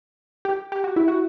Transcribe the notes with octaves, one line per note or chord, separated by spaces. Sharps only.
G4
G4
F#4
E4
F#4